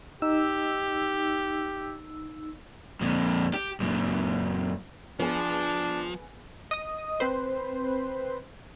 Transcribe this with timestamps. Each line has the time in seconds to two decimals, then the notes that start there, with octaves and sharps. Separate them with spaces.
0.22 D#4 G4 E6
3.01 F2 A#2
3.54 G4
3.80 F#2 A#2
5.20 F3 B3 D4 G#4
6.71 D#5 D#6
7.20 C4 B4 C5